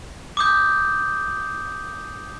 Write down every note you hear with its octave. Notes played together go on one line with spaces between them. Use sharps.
D6 D#6 G6